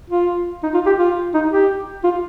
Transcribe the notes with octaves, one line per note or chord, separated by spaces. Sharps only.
F4
D#4
F4
G4
F4
D#4
G4
F4